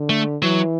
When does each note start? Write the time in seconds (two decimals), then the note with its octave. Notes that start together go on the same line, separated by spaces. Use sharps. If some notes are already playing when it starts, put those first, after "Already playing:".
Already playing: D3
0.10 A3
0.42 E3 F#3